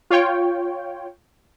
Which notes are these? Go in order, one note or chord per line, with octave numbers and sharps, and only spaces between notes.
F4 C#5 G5